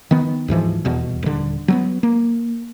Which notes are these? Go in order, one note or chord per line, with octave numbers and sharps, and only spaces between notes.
D#3 B3
D2 G#2 E3 F3
D#1 E2 B2
D#1 D3
F#3 G#3 B3
A#3